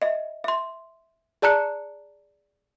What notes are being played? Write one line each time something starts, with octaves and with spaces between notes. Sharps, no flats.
D#5 E5
E5 C6
G#4 D5 A5 A#5 F#6 C#7